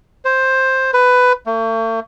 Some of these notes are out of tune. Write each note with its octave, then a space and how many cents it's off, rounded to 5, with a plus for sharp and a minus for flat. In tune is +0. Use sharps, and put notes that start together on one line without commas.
C5 +10
B4 +15
A3 +45